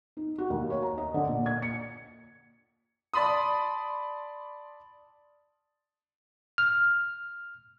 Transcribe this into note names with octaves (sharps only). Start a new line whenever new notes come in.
D#4
F#4
D#2
C#5
A#5
D#5
D3
A#2
G#6
C#7
D5 A5 B5 C6 D#6
F6